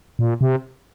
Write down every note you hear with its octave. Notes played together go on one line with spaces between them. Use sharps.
A#2
C3